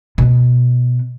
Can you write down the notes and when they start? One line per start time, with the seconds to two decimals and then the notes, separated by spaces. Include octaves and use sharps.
0.18 B2 B3